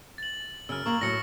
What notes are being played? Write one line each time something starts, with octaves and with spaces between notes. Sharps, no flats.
A6 F#7
F#2 C#3 E6 F6
A#3 A#4 C#6 F#7
A2 F#3 A#6 C#7